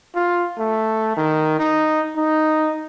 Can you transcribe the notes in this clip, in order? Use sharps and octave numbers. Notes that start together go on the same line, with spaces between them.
F4
A3
D#3
D#4
D#4